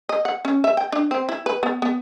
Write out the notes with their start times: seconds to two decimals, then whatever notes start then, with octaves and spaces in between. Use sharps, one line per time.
0.09 D#5
0.25 F#5
0.45 C#4
0.64 E5
0.77 G5
0.92 D4
1.11 C4
1.29 E4
1.46 B4
1.63 B3
1.82 B3